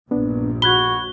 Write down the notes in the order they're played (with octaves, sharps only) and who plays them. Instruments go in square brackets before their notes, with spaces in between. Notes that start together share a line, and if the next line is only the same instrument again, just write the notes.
[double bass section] A#1 G2 [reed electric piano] B3 D4
[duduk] F#4 [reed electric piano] B5 F#6 G#6 [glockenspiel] G7